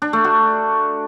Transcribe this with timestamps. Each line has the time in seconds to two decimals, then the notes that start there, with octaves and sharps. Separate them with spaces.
0.02 D4
0.13 A3
0.24 F#4